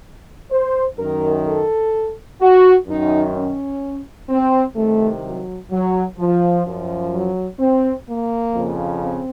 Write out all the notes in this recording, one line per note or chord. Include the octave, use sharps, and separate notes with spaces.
C5
F#2 D#3 A#4
A4
F#4
F#2 D#3 D#4
C#4
C4
C2 C3 D#3 A3
F#3
F#3
F3
F#2 F3
F#3
C4
A#3
F2 C#3 F3
C4